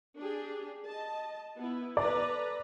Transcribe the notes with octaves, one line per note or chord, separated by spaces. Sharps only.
D4 G4 G#4
D#5 A5
B3 E4
A4 B4 D5 A#5